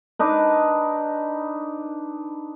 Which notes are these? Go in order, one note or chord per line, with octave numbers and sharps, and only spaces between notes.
D4 D#4 B4